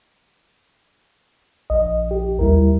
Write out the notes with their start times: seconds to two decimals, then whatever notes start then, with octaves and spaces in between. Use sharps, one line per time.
1.70 A#1 D#5
2.11 G4
2.39 D#2 G3 E4 A#4